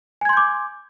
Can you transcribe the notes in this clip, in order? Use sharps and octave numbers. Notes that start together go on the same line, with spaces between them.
G#5 C6 D6 G6 G#6